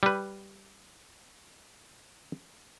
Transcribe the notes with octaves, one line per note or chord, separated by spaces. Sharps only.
G3 B4